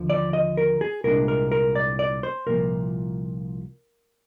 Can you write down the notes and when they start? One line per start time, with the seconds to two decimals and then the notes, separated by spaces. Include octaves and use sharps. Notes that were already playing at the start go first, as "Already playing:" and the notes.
Already playing: D#2 D3 F3
0.10 D5
0.33 D#5
0.57 A#4
0.81 G#4
1.04 C2 A#2 G#3 D4 A#4
1.28 A#4
1.52 A#4
1.75 D5
1.99 D5
2.23 C5
2.47 C2 A#2 F3 A#3 A#4